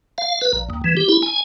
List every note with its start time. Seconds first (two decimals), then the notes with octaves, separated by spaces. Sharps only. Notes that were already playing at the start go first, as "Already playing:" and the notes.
0.18 F5
0.41 B4
0.53 A#1
0.70 D#2
0.84 E3
0.97 G4
1.09 E4
1.22 G#5